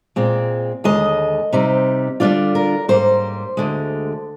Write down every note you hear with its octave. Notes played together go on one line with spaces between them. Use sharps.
A#2 G#3 C4
D#2 D3 G#3 D#5
C3 G3 C4 D#4
D3 G3 D4 F4 D5
A#4
G#2 G3 A#3 C5
D2 D3 G#3